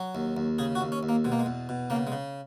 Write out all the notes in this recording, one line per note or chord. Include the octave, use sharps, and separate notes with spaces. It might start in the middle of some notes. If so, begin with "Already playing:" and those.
Already playing: F#3
D#2
D#2
C#3 G#4
F#4
D#2
C#4
D#2
A#3
B2 G#3
A#3
G#3
E2
B2
C#3 A#3
G#3
C#3